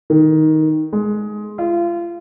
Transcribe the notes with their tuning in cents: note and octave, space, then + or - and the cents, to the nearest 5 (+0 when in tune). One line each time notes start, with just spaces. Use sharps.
D#3 +10
G#3 +15
F4 -30